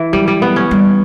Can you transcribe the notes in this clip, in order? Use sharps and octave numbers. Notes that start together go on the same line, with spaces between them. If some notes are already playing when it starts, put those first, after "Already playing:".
Already playing: E3
F#3 G3
G3
B3
C#4
G3